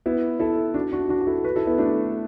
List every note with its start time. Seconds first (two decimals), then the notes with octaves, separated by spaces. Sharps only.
0.06 B3 E4
0.40 E4 A4
0.74 D4 F#4
0.92 D4 F#4
1.09 D4 F#4
1.21 F#4
1.27 E4 A4
1.44 F#4 B4
1.56 E4 A4
1.67 B3 E4
1.78 A3 D4